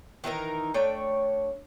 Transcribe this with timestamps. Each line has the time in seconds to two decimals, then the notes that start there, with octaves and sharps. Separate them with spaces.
0.24 D#3 E3 D#4 A#4
0.74 A3 D4 C#5 G5